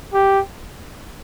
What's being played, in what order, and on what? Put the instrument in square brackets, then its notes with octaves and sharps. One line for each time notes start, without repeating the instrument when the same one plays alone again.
[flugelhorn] G4